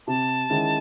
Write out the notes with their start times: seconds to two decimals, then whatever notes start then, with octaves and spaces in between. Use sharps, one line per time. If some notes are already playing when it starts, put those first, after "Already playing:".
0.07 C3 A5
0.50 D#3 G#3 C#4 E4